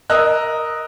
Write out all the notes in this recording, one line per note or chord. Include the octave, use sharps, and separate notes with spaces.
A#4 D#5 E6 F#6